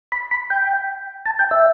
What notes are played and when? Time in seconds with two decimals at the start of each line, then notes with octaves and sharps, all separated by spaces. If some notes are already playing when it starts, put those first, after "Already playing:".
0.12 B5
0.31 B5
0.50 G5
1.26 A5
1.39 G5
1.51 E5